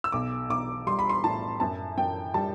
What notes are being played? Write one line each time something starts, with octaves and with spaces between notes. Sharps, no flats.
E6
B1 D6
B1 D6
G3 C6
B5
C6
A2 A5
F#2 A5
F#2 G5
G3 A5